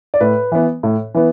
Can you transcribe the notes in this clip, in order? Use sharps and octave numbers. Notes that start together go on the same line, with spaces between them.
D5
A2 B4
E3 B3
A2
E3 B3